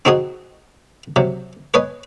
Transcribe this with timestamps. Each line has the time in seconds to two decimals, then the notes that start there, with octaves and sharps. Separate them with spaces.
0.05 C4 D#4 F#4 G#4 D#5
1.16 C3 F#3
1.74 B4 C#5 D#5 G#5